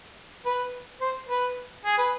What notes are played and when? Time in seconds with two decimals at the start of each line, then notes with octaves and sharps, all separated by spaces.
0.45 B4
1.01 C5
1.28 B4
1.84 G#4
1.98 B4